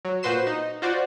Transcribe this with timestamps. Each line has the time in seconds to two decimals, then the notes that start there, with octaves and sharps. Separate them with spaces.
0.05 F#3
0.23 A#2 F#4 B4 C5 C7 E7
0.47 D#4
0.82 F4 F#4 C5 D5